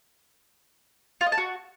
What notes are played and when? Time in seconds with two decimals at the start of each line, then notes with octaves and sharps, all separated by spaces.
1.21 F4
1.26 D#5
1.32 A5
1.38 F#4